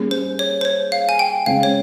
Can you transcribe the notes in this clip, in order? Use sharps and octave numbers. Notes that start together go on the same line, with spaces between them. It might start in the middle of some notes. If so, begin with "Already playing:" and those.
Already playing: G3 A#3 C#4 G#4
C5
C#5
C5
C#5
F5
G#5
G5
C#3 G#3 C4 F5
C#5